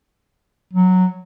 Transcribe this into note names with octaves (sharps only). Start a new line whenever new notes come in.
F#3